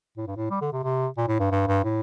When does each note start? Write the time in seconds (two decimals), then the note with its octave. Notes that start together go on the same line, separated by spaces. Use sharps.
0.17 A2
0.27 G2
0.37 A2
0.51 G3
0.61 D3
0.73 C3
0.84 C3
1.17 A#2
1.28 A2
1.40 G2
1.51 G2
1.68 G2
1.84 A2